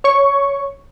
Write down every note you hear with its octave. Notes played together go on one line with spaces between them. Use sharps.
C#5 C#6